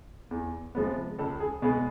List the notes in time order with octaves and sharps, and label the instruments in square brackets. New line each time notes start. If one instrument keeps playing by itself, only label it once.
[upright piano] E2
C3 F3 G#3 B3
C#2 A4
G#4
B2 G#3 B3 G#4